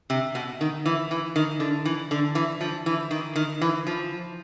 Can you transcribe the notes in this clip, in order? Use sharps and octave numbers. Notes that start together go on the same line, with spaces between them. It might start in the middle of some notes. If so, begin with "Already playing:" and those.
C3
B2
D#3
E3
E3
D#3
D3
E3
D3
E3
F3
E3
D#3
D#3
E3
F3